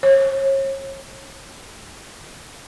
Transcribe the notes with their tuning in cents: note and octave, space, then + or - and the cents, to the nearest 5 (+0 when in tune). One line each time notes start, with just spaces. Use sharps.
C#5 -35